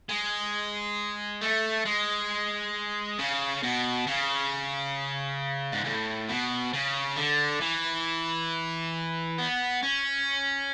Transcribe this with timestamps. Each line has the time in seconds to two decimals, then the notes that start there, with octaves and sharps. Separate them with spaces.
0.09 G#3
1.41 A3
1.85 G#3
3.19 C#3
3.63 B2
4.07 C#3
5.72 G#2
5.84 A2
6.29 B2
6.73 C#3
7.16 D3
7.61 E3
9.38 B3
9.83 C#4